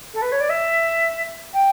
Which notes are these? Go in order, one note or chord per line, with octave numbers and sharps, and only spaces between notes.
A4
B4
C#5
D5
E5
G5